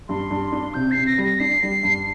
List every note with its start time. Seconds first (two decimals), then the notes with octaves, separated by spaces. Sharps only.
0.08 G2 C6
0.31 G2
0.52 D4
0.74 C3 G6
0.91 C7
0.97 C3
1.07 A#6
1.18 G3
1.23 A#6
1.40 D4 C7
1.63 G3
1.83 G2